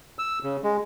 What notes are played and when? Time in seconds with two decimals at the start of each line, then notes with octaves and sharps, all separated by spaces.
0.19 E6
0.43 C#3
0.63 G#3